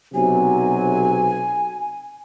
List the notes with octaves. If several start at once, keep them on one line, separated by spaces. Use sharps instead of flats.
B1 C3 F#3 G#5